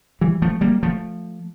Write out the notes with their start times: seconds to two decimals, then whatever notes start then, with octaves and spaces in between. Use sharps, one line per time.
0.21 E3 G3
0.42 F3 A3
0.61 G3 A#3
0.83 F3 A3